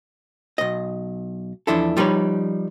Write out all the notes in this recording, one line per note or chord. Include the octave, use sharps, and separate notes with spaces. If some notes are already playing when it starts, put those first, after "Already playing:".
B1 D#5
E2 F3 D4 E4 A4
F3 G3 D#4 B4 C#5